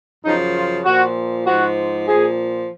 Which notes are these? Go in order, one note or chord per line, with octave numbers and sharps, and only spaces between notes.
F#2 C#3 F3 D#4
F4
A#2 F3 F#4
G#2 F3 F#4
A#2 F3 G#4